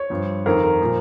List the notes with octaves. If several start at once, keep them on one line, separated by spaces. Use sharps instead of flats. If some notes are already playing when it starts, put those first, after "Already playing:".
Already playing: C#5
G2 F3
F2 D#3 A#4
A#4
A#2 F3